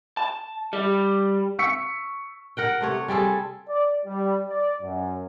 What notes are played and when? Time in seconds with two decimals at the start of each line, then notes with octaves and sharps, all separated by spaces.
0.17 A5
0.73 G3
1.59 C#6 E6 B6 C#7
2.57 A#4 F#5 G5
2.81 C3 A3 C#5
3.08 G3 C4 G#4 A4
3.68 D5
4.05 G3
4.48 D5
4.82 F#2